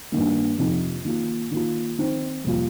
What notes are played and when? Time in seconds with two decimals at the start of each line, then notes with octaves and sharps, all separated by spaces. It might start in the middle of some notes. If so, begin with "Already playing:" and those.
0.12 G2 D#3 A#3
0.58 F2 C3 F3 D#4
1.05 D#3 A#3 F4
1.51 D#3 A#3 F4
1.98 D#3 C4 D#4
2.44 F2 C3 G3 A#3 F4